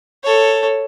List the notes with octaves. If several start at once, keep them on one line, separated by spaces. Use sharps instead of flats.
A4 C#5